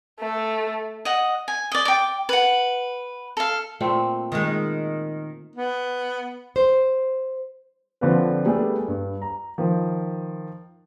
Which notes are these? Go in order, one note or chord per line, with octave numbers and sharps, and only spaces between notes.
A3
D#5 F#5
G#5
D5 D#5
G5 D6
B4 F#5
A4 F5
A#2 A3 C4
D#3 G#3
B3
C5
D3 F3 C4 D4 F4 B4
G3 A3 B3 D4 G#4 D5
G2
A#5
D#3 F3